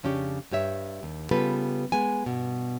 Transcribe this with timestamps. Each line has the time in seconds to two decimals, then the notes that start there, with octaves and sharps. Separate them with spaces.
0.03 F2 C#3 C#4 D4 E4 G4
0.51 G2 G4 C#5 E5
1.03 D#2
1.31 C#3 G3 B3 F4 A4 B4
1.92 G#3 B3 G#5
2.26 G2 B2